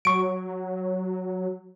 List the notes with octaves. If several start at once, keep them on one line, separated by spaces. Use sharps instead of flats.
F#3 C#6 D7